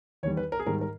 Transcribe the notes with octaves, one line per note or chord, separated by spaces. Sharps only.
E2 D#3 G3 C#5
B4
A#4
G#4
G#2 D#3 G3 A#4
A#4